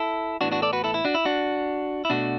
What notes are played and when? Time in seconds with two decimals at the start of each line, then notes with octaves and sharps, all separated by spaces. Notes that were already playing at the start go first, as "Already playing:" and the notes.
Already playing: E4 A4
0.41 A2 E3 B3 D4 F#4
0.52 D4 F#4
0.62 A4 D5
0.73 F#4 B4
0.84 E4 A4
0.94 E4
1.05 D4 F#4
1.15 E4
1.25 D4 F#4
2.05 E4
2.10 B2 A3 D4 F#4